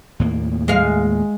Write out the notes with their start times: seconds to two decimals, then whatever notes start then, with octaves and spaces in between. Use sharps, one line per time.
0.20 D#2 A2 A#3
0.68 G#3 F5